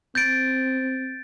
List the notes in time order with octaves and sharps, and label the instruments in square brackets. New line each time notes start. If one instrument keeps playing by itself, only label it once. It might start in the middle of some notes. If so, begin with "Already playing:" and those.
[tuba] C4 [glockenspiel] G6 A6 D7